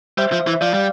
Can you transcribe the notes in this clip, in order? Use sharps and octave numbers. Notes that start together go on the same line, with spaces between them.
G3 C5 E5
F3
E3
E5
F3 D5 F5
G3